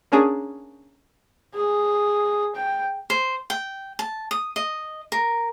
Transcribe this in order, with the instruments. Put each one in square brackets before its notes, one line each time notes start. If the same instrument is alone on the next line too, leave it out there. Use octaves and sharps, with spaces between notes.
[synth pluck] A#3 C#4 D4 G#4
[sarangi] G#4
G5
[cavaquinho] C5
G5
A5
D#6
D#5
A#4